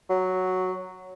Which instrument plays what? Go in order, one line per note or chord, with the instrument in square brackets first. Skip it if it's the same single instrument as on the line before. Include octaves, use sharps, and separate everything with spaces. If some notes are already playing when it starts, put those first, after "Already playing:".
[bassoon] F#3